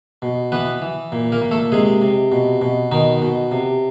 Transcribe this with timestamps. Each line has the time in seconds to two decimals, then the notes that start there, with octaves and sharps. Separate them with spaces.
0.22 B2
0.52 E3 B3 B4
0.82 E3
1.12 A#2
1.32 A#3 A#4
1.42 A#2
1.51 A3 A4
1.72 C3 G#3 G#4
2.02 C3
2.32 B2
2.62 B2
2.92 B2 D#3 D#4
3.22 B2
3.52 C3